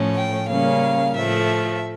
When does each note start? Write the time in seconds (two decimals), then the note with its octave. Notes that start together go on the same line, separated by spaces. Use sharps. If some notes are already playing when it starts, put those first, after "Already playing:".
Already playing: A2 F3 A3 C#4
0.15 G5
0.48 C#3 G3 A#3 C#4 F5
1.15 A2 F3 A3 E5